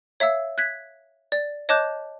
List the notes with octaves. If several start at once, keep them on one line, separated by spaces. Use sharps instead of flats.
C#5 E5 F5 E6
F#6 G#6 B6
D5
C#5 D#5 A5 D6 F#6 G6